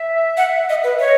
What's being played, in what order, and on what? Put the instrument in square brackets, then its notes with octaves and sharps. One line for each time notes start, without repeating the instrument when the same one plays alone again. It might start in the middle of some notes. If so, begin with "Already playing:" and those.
Already playing: [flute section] E5
[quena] F#5
D#5
B4
[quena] C#5 [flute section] D#5